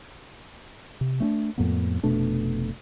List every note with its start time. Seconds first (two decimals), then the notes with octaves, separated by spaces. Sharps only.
1.01 C3
1.20 A3 C4 D4
1.58 F2 A2 A#3 B3
2.03 F1 B2 A3 D4